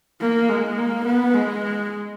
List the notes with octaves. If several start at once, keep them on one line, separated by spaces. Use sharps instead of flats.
A#3
G#3
A#3
B3
G#3